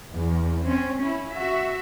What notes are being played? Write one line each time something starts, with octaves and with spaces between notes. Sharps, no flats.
E2
C4 C#4
C#4 E4
F#4 E5